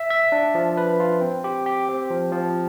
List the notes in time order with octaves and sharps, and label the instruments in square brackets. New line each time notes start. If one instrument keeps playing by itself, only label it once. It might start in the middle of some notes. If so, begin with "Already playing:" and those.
Already playing: [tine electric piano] E5
E5
D4
F3
B4
F4
C4
G4
G4
C4
F3
F3